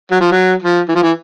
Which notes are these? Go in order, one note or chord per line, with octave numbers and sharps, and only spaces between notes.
F#3
F3
F#3
F3
E3
F3
E3